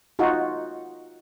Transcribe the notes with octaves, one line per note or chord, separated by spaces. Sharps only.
D#4 F4 F#4